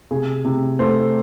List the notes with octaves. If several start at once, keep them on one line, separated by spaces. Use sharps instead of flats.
C3 G#4
C3
A3 C5